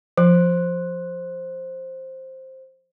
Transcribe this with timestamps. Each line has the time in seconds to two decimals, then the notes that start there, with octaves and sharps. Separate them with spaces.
0.18 F3 C5